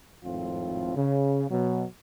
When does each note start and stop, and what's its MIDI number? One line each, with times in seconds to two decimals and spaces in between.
0.24 0.93 32
0.24 0.93 41
0.24 0.93 45
0.24 0.93 60
0.24 0.93 65
0.96 1.47 49
1.50 1.85 47
1.50 1.85 54